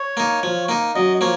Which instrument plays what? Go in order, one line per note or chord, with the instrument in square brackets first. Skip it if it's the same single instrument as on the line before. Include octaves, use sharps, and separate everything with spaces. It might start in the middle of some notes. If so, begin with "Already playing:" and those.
Already playing: [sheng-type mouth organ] C#5
[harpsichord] A#3 D#4
F3
A#3 D#4
[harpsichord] F#2 [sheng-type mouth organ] D#5
[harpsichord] F3 A#3 [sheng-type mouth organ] C#5